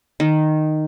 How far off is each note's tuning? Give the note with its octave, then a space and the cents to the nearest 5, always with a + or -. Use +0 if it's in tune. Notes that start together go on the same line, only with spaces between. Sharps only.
D#3 -10